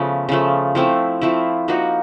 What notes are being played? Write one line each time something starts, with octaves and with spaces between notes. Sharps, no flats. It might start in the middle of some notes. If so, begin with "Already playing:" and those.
Already playing: C#3 F3 A3 B3
C#3 F3 A3
F3 A3 C4 E4
F3 A3 C4 E4
F3 A#3 D#4 F#4